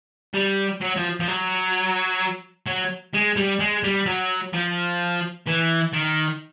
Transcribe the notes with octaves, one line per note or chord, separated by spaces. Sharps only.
G3
F#3
F3
F3
F#3
F#3
G#3
G3
G#3
G3
F#3
F3
E3
D#3